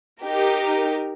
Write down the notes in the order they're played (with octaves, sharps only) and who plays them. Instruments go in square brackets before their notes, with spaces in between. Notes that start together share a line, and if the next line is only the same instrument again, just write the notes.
[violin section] D#4 G4 A#4